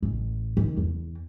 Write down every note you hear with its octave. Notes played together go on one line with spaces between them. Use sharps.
A1
D#3
E2